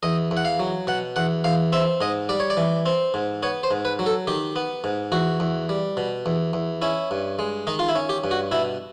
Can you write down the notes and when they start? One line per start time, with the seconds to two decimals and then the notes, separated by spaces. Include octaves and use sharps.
0.03 E2 D#5
0.31 E2
0.37 F#5
0.45 F5
0.60 F#3
0.87 B2 F#5
1.16 E2 F#5
1.44 E2 F5
1.72 C4 E5
2.01 G#2 D#5
2.29 G3 D5
2.40 C#5
2.50 D5
2.57 E3
2.86 C4
3.14 G#2
3.43 B3 C#5
3.63 C5
3.71 G#2
3.85 B4
3.99 F#3
4.06 A4
4.27 D#3 G4
4.56 B3
4.84 G#2
5.12 E2 F#4
5.40 E2
5.69 G3
5.97 B2
6.26 E2
6.53 E2
6.82 C#4 E4
7.11 G2
7.39 G#3
7.67 D#3 D#4
7.79 F4
7.89 E4
7.95 C#4
8.09 G4
8.24 G2
8.31 F#4
8.51 B2 E4